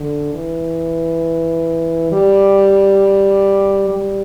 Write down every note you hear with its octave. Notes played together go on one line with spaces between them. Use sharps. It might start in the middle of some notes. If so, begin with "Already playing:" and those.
Already playing: D3
E3
G3
G3